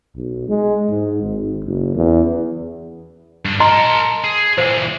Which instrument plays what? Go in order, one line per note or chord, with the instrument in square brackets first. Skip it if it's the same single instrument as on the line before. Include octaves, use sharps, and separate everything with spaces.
[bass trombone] B1
G#3
G#2
G#1
F#1
E2
[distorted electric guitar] G2 D4
[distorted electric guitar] A#4 A5 [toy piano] D#5 A#5 C6
[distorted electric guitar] G#4
[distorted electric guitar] A#2 E3 [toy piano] C5